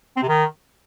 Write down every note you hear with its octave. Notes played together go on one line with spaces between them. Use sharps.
C4
C3
D#3